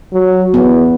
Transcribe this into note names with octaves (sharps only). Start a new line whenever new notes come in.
F#3
E2 B3